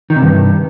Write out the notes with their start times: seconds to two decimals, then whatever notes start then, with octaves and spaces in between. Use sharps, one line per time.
0.10 D#3
0.16 C3
0.22 G2